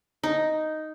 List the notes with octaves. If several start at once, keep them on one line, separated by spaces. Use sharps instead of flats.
D#4